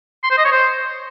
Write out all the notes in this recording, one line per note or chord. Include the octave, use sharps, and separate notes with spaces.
C6
C5
D#5
C#5
C5